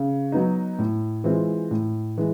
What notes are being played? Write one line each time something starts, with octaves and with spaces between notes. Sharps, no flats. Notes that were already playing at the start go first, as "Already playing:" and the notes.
Already playing: C#3
F#3 B3 D#4
A2
E3 G#3 C4 F4
A2
E3 G#3